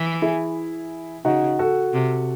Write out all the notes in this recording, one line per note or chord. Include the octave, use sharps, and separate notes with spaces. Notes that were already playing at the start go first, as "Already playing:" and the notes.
Already playing: E3
E4 G#4
C#3 D#4 F#4
F#4 A4
C3